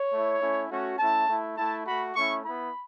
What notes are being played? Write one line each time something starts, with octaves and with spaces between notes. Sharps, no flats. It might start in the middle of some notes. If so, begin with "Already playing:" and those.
Already playing: C#5
A3 E4
A3 C#4 E4
A3 C#4 F#4
A3 C#4 E4 A5
A3 E4
A3 E4 A5
A3 F#4 B5
A3 C#4 E4 C#6
B3 E4 B5